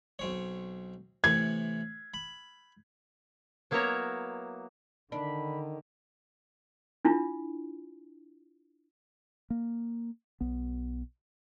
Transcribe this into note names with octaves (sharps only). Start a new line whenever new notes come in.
B1 C4 C#5
A2 C3 E3 G#6
B5
F#3 A#3 B3 E4 C#5 A#5
D3 D#3 D4 B5
D4 E4 F4
A#3
B1 B3